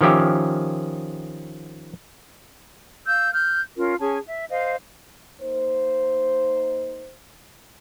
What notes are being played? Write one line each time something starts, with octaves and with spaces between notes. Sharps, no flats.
D#3 F3 C#4 G4 E5
F5 E6 G6
F6 G6
C#4 F4 A#4
C#4 G#4 G#5 A5
E5
C5 D#5 F5
A#3 D#4 C5